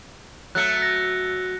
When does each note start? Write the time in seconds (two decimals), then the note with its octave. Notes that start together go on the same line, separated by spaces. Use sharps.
0.55 F#3 A3 F#6 C#7
0.82 A#6